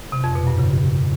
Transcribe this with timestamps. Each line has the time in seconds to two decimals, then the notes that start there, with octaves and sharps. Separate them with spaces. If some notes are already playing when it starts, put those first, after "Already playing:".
0.12 C3
0.24 F2
0.35 B2
0.47 G2
0.58 C#3